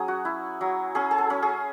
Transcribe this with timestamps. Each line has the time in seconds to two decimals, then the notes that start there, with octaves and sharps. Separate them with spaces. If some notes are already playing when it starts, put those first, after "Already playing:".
Already playing: F#3 C#4 G#4
0.08 F#4
0.25 E4
0.61 F#3
0.95 C#4 G#4
1.11 G#4
1.18 A4
1.30 C#4
1.42 G#4